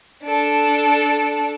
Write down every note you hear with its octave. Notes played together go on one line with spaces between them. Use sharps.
D4 A4